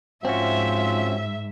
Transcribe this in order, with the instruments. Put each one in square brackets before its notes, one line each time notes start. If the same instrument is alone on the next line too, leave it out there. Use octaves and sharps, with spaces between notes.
[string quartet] G#2 [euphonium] F3 [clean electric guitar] C4 C#4 F#4 [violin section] E5